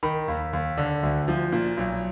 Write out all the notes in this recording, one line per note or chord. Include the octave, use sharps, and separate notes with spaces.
D#3 B5
D#2
D#2
D3
D2
F3
A#2
B1